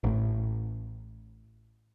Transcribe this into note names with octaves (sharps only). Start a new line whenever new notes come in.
A1 A2